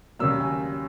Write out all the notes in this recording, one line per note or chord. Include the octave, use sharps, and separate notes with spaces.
D#2 C#3 F#3 A#3 E6
G#5